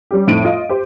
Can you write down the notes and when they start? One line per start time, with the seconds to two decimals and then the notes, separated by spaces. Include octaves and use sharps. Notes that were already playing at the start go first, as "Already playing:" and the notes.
0.11 G3 C#4 G4
0.27 F2 A2 C4 D#4 D7 D#7
0.45 F4 D#5
0.69 G4 C5